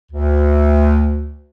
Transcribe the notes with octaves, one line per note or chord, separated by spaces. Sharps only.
D2